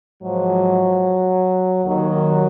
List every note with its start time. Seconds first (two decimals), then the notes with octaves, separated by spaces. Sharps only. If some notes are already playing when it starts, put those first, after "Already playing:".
0.21 G#2 F3 F#3
1.84 D#2 D#3 F#3